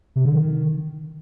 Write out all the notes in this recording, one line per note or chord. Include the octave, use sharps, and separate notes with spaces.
C3
D3
D#3